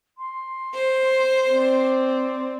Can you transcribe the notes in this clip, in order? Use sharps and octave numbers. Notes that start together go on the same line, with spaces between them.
C6
C5
C4 D5